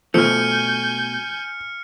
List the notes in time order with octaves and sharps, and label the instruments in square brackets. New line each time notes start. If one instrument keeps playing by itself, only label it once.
[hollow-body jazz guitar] B2 A3 [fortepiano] F3 [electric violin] G#5 G6 [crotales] F6 C#7